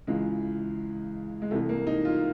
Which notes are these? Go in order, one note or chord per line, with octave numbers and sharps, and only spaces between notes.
C#2 C#3 E3 G#3
G#3
C2 C3 E3 A3
A#3
D#4
F4